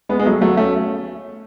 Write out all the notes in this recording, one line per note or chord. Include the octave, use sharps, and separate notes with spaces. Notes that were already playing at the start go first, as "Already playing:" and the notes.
G#3 B3
G#3
F#3 A3
F#3 A3
A3 C#4